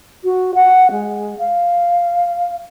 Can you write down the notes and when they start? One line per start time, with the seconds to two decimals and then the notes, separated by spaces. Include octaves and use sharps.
0.24 F#4
0.55 F#5
0.91 G#3
1.38 F5